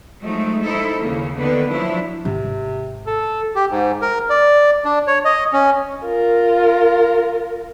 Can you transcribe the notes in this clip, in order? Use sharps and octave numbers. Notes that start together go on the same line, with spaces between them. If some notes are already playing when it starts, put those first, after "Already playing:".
F3 F#3 G#3 A3 D#4
D#4 E4 A4 C5
D#2 C#3 A#3
D3 D#3 A#3 B3 D4 B4
F3 F#3 D4 E4
G#1 C3
A4
G4
G#2
A#4
D5
D4
C#5
D#5
C#4
F4 A#4